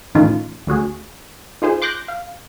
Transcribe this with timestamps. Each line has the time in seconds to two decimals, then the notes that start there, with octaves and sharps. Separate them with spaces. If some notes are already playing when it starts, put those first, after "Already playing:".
0.15 A2 D#3 E3 C#4 D#4 F4
0.67 D2 D3 F#4 G#4
1.62 D#4 F4 G#4 C5
1.82 C6 D6 F#6 G6 A#6
2.08 F5